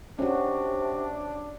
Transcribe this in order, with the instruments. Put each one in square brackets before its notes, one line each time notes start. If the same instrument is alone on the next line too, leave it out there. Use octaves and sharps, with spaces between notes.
[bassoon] C3 [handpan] C#4 F#4 [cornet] D4